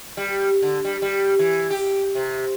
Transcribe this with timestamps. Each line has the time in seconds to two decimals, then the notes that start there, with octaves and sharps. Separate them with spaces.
0.17 G3
0.62 D3
0.85 G3
1.02 G3
1.39 E3
1.70 G4
2.15 C3